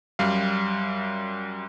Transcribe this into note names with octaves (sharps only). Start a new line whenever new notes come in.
F#2 G3 F5